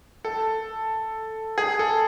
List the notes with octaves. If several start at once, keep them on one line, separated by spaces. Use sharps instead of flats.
A4
G#4
A4